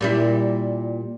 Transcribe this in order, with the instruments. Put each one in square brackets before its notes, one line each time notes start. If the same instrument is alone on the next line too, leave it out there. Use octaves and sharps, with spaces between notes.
[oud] A#2 G3 E4